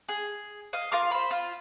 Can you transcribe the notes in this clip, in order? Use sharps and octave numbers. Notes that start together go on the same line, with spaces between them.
G#4
D#5 F5
F4 A#4 F5 D6
C5 B5
F4